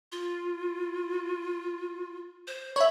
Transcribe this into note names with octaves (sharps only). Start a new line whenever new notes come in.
F4
C5
C#5 E5 B5